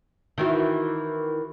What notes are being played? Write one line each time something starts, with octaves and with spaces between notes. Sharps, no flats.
D#3 E3 F#4